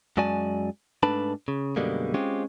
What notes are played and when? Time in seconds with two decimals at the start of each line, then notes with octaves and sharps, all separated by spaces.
0.17 F#2 G#3 F#4 D5 G#5 A5
1.03 G#2 A3 D4 B4 A5 B5
1.48 C#3
1.76 F#2 B2 D3 G3 G#3 A#3
2.14 G#3 C4 C#4 F4 G4